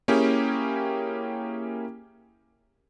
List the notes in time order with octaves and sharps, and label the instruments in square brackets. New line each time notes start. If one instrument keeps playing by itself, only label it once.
[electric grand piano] A#3 C#4 E4 G4 G#4 G5